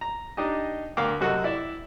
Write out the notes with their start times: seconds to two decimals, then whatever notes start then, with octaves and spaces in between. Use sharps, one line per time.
0.01 A#5
0.37 D4 D#4 G4 D#5
0.97 D2 A#4 F5 G5 D6
1.21 F#2 C3 F#4 A4 D#5
1.44 E4 D5 E5